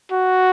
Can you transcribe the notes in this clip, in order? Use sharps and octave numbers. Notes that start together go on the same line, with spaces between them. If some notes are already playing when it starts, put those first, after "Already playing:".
F#4